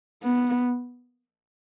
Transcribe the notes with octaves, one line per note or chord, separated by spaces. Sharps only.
B3